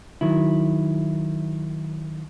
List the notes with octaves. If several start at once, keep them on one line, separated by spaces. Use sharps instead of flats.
D#3 F#3 E4